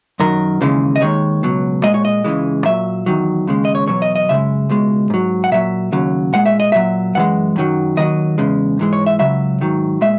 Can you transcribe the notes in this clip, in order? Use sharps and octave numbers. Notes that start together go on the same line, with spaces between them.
F#2 D#3 F#3 A#4
D#2 C#3 E3 G#3
D#5
D#2 D#3 G#3 C#5
C#2 B2 F#3
A#2 G#3 D#5
C#5
D#5
C#2 C#3 E3 G#3
A#2 F#3 E5
E2 D#3 F#3
D#2 C#3 G#3
D#5
C#5
E2 B2 F#3 C#5
D#5
D#5
F#2 C#3 G#3 E5
C#2 B2 G#3
G#2 F#3
F#5
A#2 F#3 E5
D#2 C#3 F#3
A#2 G#3 F#5
E5
D#5
A#2 F#3 E5
F#2 E3 G#3 F#5
F#2 D#3 F#3
D#2 D#3 F#3 D#5
E2 C#3 G#3
G#2 E3 G#3
C#5
E5
C#2 C#3 F#3 E5
G#2 D#3 F#3
A#2 G#3 E5